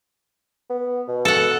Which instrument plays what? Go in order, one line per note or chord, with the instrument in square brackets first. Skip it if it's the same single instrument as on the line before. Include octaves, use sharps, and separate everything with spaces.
[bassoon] B3
B2
[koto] A4 F#5